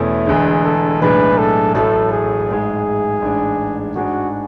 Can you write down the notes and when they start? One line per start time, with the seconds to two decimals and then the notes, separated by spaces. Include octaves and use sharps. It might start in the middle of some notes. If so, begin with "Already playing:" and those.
Already playing: E2 B2 A3 C#4 E4
0.27 E1 E2 D3 G#4
0.65 A4
1.02 B1 A2 G#3 D4 B4
1.38 A4
1.74 A1 A2 F#3 A3 A4
2.12 G#4
2.48 A1 G#2 G#3
3.22 A1 G#2 G#3 D4
3.96 G#2 G#3 D4 F#4